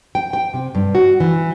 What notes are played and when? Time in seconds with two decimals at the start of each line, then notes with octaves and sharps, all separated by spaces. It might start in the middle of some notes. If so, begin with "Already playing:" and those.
0.15 G5
0.33 G5
0.54 C3
0.75 G2
0.95 F#4
1.20 E3